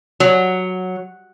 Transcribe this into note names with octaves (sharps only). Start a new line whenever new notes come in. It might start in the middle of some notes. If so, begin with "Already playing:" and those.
F#3